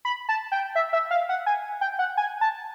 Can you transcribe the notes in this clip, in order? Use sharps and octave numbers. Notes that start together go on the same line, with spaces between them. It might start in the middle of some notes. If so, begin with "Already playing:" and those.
B5
A5
G5
E5
E5
F5
F#5
G#5
G5
F#5
G#5
A5